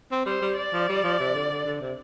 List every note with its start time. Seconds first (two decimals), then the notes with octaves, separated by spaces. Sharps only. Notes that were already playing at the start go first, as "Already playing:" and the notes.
0.12 C4
0.26 G3 C5
0.42 G3
0.57 D5
0.73 F3
0.89 G3
1.04 F3
1.20 C3
1.35 D3
1.50 D3
1.65 D3
1.81 C3